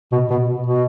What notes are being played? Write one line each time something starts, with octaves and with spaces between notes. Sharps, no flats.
B2
B2
B2